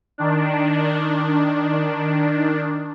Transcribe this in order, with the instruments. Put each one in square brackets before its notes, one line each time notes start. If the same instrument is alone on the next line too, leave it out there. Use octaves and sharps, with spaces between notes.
[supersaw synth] D#3 D4